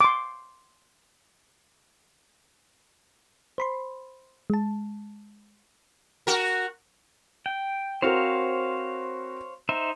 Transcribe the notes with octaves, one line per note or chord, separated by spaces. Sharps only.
C6 D6
C5 B5 C6
G#3 A5
F#4 A#4
G5
C4 F#4 A#4 C5 C#5 F5
D#4 C5 E5